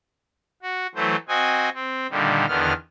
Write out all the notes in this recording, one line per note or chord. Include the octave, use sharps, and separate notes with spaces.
F#4
E3 F#3 A3 C5
C4 F#4 D#5 G#5
C4
A#2 D3 D#3 G3
E2 D3 D#3 B3 F6